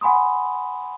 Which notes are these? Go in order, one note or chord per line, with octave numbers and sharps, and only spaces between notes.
F#5 G#5 B5 C6 D#6